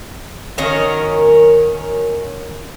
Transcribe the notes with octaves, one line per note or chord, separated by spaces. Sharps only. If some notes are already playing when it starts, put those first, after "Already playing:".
D#3 F#3 C#4 A#4